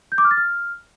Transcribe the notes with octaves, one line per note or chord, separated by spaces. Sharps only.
G6
D6
F6
A6
F6